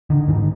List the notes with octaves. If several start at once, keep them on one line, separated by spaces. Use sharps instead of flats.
D3 D#3
G#2 D#3